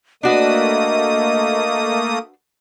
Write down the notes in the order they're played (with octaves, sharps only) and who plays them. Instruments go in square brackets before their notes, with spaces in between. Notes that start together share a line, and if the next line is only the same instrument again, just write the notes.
[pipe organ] A3 A#3 D#6 [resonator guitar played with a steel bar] D4 F#4 B4 [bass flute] D#5